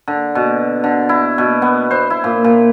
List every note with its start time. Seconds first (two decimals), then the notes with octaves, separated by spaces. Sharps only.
0.08 D3
0.35 B2
0.84 D3
1.09 E4
1.38 B2
1.62 B3
1.91 C5
2.10 E4
2.24 A#2
2.44 A#2